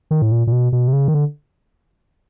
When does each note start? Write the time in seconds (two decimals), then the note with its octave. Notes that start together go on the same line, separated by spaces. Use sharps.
0.11 D#3
0.22 A2
0.32 A#2
0.47 A#2
0.52 B2
0.72 B2
0.88 C3
0.93 C#3
1.08 D#3
1.14 D3